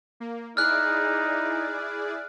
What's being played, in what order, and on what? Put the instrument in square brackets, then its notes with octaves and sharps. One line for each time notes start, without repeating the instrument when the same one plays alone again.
[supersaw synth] A#3
[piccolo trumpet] D#4 [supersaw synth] E4 G#4 D5 [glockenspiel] F6 F#6